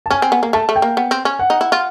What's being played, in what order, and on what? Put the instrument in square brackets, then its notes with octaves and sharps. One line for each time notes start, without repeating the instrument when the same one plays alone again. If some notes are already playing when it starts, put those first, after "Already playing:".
[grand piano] A5
[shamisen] C#4 [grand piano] G#5
[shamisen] C4
B3
A#3
[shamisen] A3 [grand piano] A5
[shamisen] A3
[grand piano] G5
[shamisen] A#3
B3
C4
C#4
[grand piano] F#5
[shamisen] D#4
E4
F4